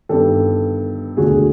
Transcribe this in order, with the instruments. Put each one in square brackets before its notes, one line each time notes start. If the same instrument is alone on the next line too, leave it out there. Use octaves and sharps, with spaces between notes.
[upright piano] G1 G2 D#3 G4 A4
E1 D2 D3 F#4 G#4